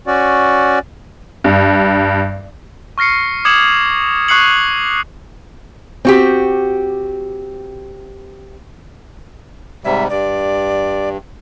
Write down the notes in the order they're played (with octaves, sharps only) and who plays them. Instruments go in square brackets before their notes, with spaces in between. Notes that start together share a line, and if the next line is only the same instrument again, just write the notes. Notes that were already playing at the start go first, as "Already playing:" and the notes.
[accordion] C#4 F#4 D5
[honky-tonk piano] G2
[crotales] C#6 F6 A#6 C7 C#7
D6 D#6 G#6 C#7 E7 F#7
C#6 D#6 F#6 C7 C#7 F#7
[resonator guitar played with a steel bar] C4 F#4 G4
[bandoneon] G#2 C3 G3 [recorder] E5
[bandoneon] G2 [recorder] D5